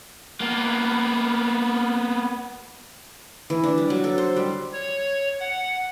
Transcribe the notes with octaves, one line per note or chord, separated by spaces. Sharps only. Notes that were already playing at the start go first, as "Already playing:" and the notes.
A#3 B3
E3
D4
G3
F#3
A4
C5
G3
C#5
F#5